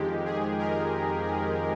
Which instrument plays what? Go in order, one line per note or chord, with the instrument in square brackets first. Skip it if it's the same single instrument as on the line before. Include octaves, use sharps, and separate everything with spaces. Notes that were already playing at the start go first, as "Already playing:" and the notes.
Already playing: [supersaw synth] F2 D#3 G#3 G4
G#4
A#4
G#4